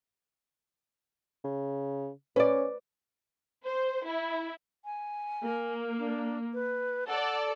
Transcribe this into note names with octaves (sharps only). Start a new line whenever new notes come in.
C#3
C#4 B4 D5
C5
E4
G#5
A#3
D4
B4
A4 D5 F#5